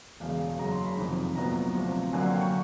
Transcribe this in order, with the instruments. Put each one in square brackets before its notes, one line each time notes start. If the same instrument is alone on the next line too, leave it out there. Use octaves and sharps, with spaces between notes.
[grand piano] E1 E2 C#3 F5
F#1 F#2 C#3 F#3 A#5
C6
B5
F1 F2 C3 D#3
C2 A#2 F#3 B3 A#5
D2 C3 F3
F#2 D3 F#3 A#3 G#5
F#5
G5
C#6